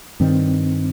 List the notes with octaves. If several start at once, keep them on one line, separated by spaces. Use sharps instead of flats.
G2 D#3 G3 C4